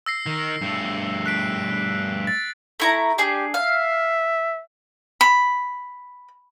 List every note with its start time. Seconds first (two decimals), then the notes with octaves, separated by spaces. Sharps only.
0.06 E6 A#6 C7
0.26 D#3
0.61 G2 A3
1.26 F#6 B6 D7
2.27 A6
2.80 A3 E4 A#5
3.18 D4 G4 G#4
3.54 E5 F5
5.21 B5